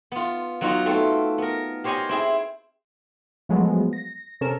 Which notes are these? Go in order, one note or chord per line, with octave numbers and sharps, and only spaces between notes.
B3 F4
F#3 B3 D#4 F4 F#4
A3 C4 A4
B3 A#4
G4 C5 C#5 D#5 G#5 B5
C4 E4 G#4
F3 F#3 G#3 A3 B3
A#6
C3 C#4 A4 A#4 E7